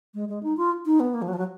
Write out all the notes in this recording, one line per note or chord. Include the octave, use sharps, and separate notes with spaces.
G#3
G#3
D#4
F4
D#4
B3
A#3
F3
F#3
F3
F#3